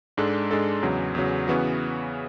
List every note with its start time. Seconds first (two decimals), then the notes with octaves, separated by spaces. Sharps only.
0.17 G#2 G#3 D4 A4
0.51 G#2 G#3 D4 A4
0.83 E2 C#3 F#3
1.15 E2 C#3 F#3
1.48 C#3 E3 B3 F#4